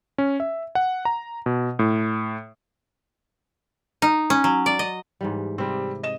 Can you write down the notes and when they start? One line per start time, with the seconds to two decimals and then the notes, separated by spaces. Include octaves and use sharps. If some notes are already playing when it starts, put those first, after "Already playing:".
0.18 C#4
0.40 E5
0.75 F#5
1.05 A#5
1.46 B2
1.79 A2
4.02 D#4
4.30 C#4
4.44 F#3
4.66 D5
4.79 D#5
5.21 G#2 E3 G3
5.58 C3 G3 C4
6.03 D#5 E7